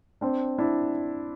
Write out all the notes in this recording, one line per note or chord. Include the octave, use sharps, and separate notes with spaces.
C4 D4
D4 E4